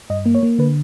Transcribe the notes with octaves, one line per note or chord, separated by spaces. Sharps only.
G2 D#5
A#3
C#5
A#3
D3 B4